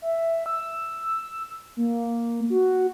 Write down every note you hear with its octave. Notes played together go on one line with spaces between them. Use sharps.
E5
E6
A#3
F#4